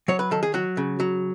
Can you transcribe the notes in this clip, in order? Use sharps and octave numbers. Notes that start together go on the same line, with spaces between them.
F#3 C#5
B4
D#3 A4
G#4
F#3 F#4
C#3
F#3